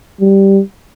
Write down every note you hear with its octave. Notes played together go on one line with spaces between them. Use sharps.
G3